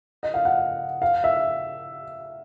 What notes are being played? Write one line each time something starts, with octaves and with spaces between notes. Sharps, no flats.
D#5
F5
F#5
F5
E5